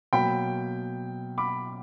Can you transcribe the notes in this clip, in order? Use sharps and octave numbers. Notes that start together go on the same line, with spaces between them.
B2 F#3 A#3 G5 B5
B5 D6